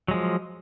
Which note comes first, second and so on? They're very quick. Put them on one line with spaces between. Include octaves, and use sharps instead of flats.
F#3 G#3 F3